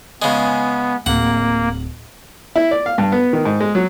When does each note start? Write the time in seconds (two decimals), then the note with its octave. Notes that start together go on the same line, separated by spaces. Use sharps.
0.22 C#3 G#3 B3
1.06 D1 A#3 F#5
2.56 E4
2.71 D5
2.86 F5
2.98 G2
3.12 B3
3.33 D#3
3.45 G#2
3.60 G#3
3.75 F#3